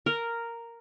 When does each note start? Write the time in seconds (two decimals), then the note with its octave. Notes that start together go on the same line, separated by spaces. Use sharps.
0.06 A#4